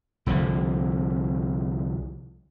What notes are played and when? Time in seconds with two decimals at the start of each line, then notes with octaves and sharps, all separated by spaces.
0.26 C2 D3 F3